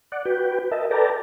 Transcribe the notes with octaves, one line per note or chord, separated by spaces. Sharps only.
D5 F#5
F#4 B4 G5
A#4 D#5 E5 A5
A4 B4 D5 G5 A5 A#5